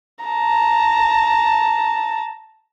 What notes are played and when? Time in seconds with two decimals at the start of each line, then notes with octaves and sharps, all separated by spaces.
0.25 A5 A#5